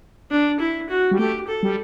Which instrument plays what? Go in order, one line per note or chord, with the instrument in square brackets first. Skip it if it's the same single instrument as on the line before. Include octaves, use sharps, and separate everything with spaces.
[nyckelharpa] D4
E4
F#4
[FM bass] G3
[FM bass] A3 [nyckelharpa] G4
[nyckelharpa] A4
[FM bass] G3